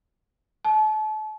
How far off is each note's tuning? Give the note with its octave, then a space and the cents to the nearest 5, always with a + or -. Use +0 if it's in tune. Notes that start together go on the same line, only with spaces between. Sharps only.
A5 -35